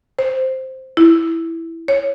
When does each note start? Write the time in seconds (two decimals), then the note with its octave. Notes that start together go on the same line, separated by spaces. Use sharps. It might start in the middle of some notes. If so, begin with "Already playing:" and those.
0.19 C5
0.97 E4
1.88 C#5